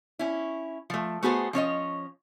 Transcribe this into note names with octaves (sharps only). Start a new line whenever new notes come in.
C#4 E4
F3 A3
A3 B3 F#4 G#4 A4 C5
F3 C#4 C#5 D#5